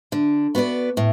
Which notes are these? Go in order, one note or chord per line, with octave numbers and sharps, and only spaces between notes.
D3
B3 F#4 B4 D5
A2